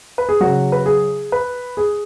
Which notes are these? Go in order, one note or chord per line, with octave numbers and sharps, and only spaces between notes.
B4
G#4
C#3 F#3 F#4
B4
G#4
B4
G#4